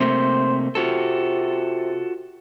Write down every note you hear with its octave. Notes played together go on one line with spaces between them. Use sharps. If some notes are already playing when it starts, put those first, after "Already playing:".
C3 A3 A#3 C5
C3 F4 F#4 A4